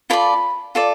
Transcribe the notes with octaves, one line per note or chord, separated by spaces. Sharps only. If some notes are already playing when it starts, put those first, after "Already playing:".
F4 A4 D5 B5
F4 A4 D5